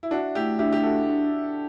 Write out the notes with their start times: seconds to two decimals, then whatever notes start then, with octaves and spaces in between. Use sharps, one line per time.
0.03 E4
0.11 D4 F#4 E5
0.35 A3 E4 G4
0.59 D4 E4 G4
0.72 G4
0.83 F#4 A4 E5
1.07 D4
1.31 D4